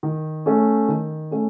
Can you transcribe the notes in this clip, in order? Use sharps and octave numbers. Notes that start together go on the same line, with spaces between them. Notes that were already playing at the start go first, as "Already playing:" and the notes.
D#3
A3 C#4
D#3
A3 C#4